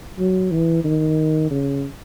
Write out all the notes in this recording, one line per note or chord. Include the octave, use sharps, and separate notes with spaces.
F#3
E3
D#3
C#3